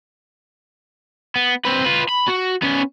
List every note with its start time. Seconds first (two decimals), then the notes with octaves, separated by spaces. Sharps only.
1.36 B3
1.65 C4 B4
1.85 F4 B4
2.09 B5
2.28 F#4
2.62 B3 C#4